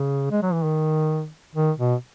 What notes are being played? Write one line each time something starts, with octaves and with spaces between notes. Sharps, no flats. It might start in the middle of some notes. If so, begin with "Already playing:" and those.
Already playing: C#3
G#3
F#3
E3
D#3
D#3
B2